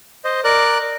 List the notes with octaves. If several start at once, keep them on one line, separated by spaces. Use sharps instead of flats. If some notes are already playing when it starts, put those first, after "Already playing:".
C5 D#5
A#4 D5 F#6